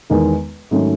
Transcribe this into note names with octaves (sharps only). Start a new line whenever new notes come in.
E2 D#3 G#3 B3 D#4
G#2 D#3 F#3 A3 C#4